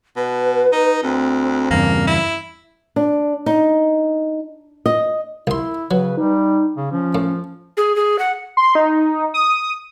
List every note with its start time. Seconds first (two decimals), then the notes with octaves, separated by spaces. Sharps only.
0.16 B2 B4
0.72 D#4
1.03 D2 C4
1.71 E2 G2 C#3 A#3
2.07 E4
2.96 D4
3.46 D#4
4.86 D#5
5.47 C2 E4 C6
5.91 C#3 F#3 B4
6.17 G3 D#4
6.77 C#3
6.92 F3 C#4
7.15 A2
7.77 G#4
7.96 G#4
8.19 F#5
8.57 C6
8.75 D#4
9.34 D#6